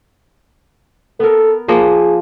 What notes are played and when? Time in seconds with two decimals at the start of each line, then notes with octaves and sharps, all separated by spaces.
1.20 B3 A4 A#4
1.69 F3 A#3 G#4 D#5